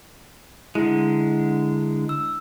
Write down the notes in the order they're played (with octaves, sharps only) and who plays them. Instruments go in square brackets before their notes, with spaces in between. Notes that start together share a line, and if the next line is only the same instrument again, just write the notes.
[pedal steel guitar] D3 G#3 [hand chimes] E4
[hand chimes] E6